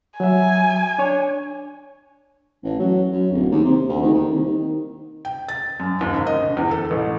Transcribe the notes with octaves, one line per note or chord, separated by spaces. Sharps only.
F#3 E5 G#5
D4 C#5
A1
F#3
F#2
D1
D#2
C3
D2
D#3
D#2
C2
D#3
G5
A6
F#2
D#2
G#1
D#5
D3
E2
A4
A1